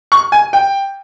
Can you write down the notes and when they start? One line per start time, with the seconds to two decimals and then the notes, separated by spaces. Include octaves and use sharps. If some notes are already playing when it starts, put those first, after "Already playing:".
0.12 C#6
0.32 G#5
0.53 G5